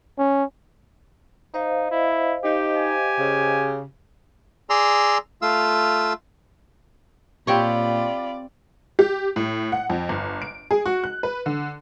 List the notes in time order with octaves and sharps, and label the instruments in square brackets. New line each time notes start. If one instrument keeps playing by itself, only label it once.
[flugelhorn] C#4
[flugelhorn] D#4 [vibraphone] C5 D#5 F5
[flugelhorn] E4
[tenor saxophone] D#4 [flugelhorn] G4
[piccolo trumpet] G#5
[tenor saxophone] C#3
[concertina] G#4 D5 A#5 C6 E6
A3 F4 F5 E6
[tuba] A#2 [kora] C4 G4 C#5 [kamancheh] F4 B5 [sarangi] D5
[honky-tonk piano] G4
A2
F#5
F2
G1
D7
G#4
F#4
F#6
B4
D3